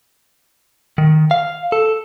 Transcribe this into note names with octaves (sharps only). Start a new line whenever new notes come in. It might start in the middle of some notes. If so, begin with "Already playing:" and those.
D#3
F5
A4